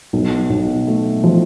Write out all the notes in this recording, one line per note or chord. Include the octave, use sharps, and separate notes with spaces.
B1
B1
A3
F3